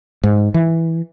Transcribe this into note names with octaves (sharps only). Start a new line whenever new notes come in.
G#2
E3